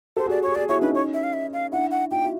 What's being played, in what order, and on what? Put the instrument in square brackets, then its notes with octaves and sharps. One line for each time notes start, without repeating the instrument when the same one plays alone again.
[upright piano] G4 A4 [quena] C5
[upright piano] F#4 G#4
[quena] D5
[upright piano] F#4 G#4 [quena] C#5
[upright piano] F#4 G#4 [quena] D5
[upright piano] E4 F#4 [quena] C#5
[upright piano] C#4 D#4 [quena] B4
[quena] C#5
E5
F5
E5
F5
[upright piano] D4 E4 [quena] F#5
[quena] F#5
[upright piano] D#4 F4 [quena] G5
[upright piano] E4 F#4